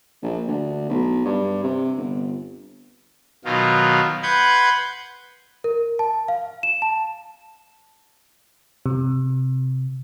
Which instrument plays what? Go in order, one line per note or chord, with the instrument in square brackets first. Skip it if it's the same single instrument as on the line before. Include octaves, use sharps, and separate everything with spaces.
[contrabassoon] A#1
D2
B1
G2
C3
G1
[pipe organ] B2 D#3 F#3 F4
B4 F#5 C6 G6 G#6
[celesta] A#4
A5
F5
E7
A5
[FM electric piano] C3